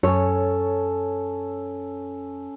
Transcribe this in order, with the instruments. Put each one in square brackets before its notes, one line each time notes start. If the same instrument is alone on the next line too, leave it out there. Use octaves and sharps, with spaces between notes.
[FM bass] F#2 [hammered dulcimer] C#4 A4 [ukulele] C#5